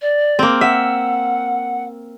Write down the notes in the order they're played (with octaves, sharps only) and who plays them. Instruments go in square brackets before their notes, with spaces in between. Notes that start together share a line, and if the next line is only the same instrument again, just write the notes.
[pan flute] D5
[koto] A#3 C4
[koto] E5 [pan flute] F#5